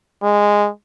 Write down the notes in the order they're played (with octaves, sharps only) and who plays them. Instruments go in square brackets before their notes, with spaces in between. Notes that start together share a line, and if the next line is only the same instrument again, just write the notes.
[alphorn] G#3